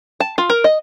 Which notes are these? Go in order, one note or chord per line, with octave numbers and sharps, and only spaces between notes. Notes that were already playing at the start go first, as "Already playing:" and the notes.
A5
F4
A#4
D#5